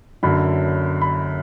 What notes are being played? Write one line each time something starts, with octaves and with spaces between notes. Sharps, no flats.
F#1 F#2 D3 B5
B5